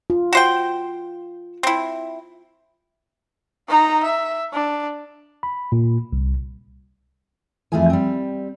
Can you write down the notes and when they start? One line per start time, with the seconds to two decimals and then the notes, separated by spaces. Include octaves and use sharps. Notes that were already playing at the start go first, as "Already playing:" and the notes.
0.10 F4
0.33 F#4 C5 G5
1.63 C4 E4
3.68 D#4 A#5
4.04 E5
4.53 D4
5.43 B5
5.72 A#2
6.13 C2
7.72 F2 E3 A3 F4 G#4 G#5
7.90 G3 C4